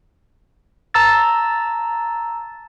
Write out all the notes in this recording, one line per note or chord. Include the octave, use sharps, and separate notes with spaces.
A5 A#5 E6 A6